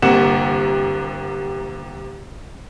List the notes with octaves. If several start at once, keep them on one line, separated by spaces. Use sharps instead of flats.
G1 C3 A#3 F#5 E7